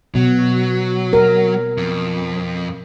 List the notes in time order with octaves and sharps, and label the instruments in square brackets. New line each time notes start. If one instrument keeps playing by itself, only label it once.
[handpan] B2 [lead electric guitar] F#3
[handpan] A#4
[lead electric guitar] F2